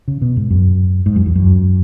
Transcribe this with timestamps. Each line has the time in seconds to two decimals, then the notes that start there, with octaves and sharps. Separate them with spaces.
0.08 C#3
0.22 B2
0.37 G#2
0.51 F#2
1.06 G#2
1.16 F#2
1.26 E2
1.35 F#2